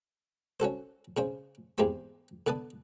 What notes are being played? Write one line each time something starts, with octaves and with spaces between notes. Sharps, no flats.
C#4 F#4 A4 C5
C#3 C#4 C5
E2 G#2 C4 G4 C5 B5
D3 B3 B4 A5 D#6